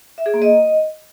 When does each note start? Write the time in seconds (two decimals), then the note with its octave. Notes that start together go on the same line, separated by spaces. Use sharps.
0.18 E5
0.26 G#4
0.34 A#3
0.42 D#5